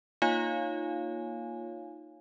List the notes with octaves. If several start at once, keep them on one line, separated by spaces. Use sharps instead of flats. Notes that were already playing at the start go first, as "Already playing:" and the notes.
A#3 D#4 F4 C#5 F5 G#5